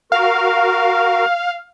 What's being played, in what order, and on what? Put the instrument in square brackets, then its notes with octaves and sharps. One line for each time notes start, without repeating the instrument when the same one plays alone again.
[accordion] F#4 A#4 [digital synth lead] F5